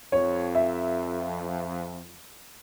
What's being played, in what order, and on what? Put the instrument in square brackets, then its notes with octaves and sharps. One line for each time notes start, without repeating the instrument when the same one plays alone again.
[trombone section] F2 [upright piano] C#5
[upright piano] E5